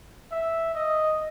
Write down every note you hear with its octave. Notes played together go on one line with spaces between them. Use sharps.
E5
D#5